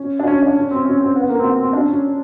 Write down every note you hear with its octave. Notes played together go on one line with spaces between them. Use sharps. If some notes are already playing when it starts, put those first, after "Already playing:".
Already playing: C#4
D4
C#4
D4
C#4
C4
C#4
C4
B3
A#3
C4
B3
C4
D4
C#4